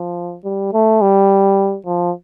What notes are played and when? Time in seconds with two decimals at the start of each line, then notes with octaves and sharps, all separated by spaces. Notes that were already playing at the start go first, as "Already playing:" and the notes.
Already playing: F3
0.45 G3
0.73 A3
1.02 G3
1.86 F3